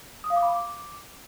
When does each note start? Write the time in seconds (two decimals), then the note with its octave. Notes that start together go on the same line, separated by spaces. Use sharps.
0.24 D#6
0.30 F5
0.36 D6
0.43 B5
0.49 D6